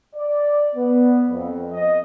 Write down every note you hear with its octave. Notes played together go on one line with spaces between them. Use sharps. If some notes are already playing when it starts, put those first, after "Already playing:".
D5
B3
F2
D#5